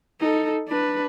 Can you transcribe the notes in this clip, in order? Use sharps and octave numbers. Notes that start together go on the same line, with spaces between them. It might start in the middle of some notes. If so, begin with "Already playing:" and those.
D#4 A4
D4 B4